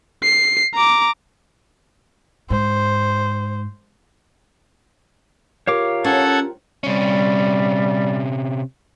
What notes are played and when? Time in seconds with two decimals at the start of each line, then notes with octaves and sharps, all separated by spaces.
0.23 C7
0.74 A#5 D6
2.50 G#2 C5
5.67 F4 G4 A#4 C#5 F5 D6
6.04 C#4 A4 F#5 G#6
6.83 C3 G3 C#4